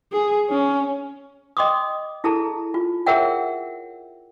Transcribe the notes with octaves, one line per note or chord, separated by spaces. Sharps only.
G#4
C#4
D#5 G5 C6 D6 D#6
E4 G#4 A4 A5 A#5
F4
G#4 A#4 C#5 E5 F#5 G5